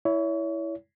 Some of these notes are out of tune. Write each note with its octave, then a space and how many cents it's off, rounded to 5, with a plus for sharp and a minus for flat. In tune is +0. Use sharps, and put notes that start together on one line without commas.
E4 +0 C#5 +30